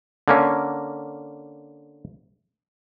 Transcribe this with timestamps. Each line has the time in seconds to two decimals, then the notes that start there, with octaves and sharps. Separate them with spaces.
0.28 D3 A#3 C#4